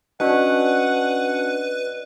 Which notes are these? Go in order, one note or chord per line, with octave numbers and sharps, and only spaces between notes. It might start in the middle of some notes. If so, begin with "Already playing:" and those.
C#4 D4 F#4 B4 D5 D#5 F#5